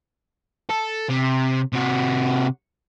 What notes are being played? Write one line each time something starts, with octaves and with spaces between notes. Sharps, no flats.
A4
C3
C3 F#4